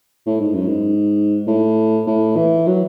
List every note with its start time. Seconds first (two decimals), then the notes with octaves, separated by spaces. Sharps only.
0.26 A2
0.40 G#2
0.54 F#2
0.68 G#2
1.47 A2
2.07 A2
2.37 E3
2.67 F#3